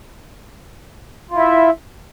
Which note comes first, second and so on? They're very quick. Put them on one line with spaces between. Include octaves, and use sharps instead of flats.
F4 E4 E5